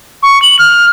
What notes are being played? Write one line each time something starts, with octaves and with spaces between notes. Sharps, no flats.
C#6
F#7
F6